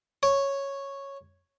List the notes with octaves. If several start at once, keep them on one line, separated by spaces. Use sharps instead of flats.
C#5